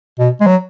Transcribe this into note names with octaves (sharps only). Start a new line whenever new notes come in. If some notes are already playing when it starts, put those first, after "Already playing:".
B2
G#3
F#3